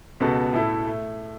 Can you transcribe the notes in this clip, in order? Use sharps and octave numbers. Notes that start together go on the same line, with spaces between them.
C#2 B2 B3 F#4 A4
A2 A3 E4 A4
A3